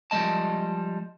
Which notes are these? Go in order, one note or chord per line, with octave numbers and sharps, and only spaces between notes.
F3 G3 G#3 D#5 A5